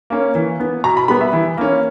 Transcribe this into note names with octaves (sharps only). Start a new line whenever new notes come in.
A#3 C#4
E3
B3
B2 A#5
B5
G3 B3 B5
E5
E3
A#3 C#4